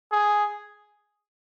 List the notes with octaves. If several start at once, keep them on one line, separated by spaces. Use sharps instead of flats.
G#4